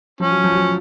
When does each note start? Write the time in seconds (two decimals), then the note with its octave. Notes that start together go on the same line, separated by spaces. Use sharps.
0.20 F3 C#4
0.31 F#3
0.44 F3
0.55 F#3